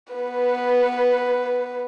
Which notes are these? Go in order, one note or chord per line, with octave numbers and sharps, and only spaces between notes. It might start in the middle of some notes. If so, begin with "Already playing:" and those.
B3 B4